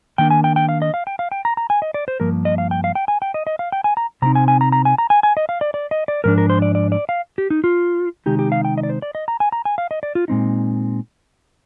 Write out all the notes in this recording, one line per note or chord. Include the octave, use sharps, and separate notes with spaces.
D#3 A#3 D4 G5
G#5
G5
G5
F5
D#5
F5
G5
F5
G5
A#5
A#5
G#5
D#5
D5
C5
G2 F3 A#3 A#4
D#5
F5
G5
F5
G5
G#5
G5
D#5
D#5
F5
G5
G#5
A#5
C3 G3 C4 D#4 A#5
G#5
G#5
A#5
A#5
G#5
A#5
G#5
G#5
D#5
F5
D5
D5
D#5
D5
G#2 F3 D4 A#4
A#4
C5
D5
D5
D5
F5
G4
D#4
F4
C3 D#3 G#3 D#4 G4
G4
F5
G5
D#5
D5
C5
D5
D#5
A#5
G#5
A#5
G#5
F5
D#5
D5
F4
A#2 G#3 C4 D#4